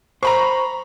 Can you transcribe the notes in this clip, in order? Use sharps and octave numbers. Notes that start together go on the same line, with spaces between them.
C5 A#5 B5 C#6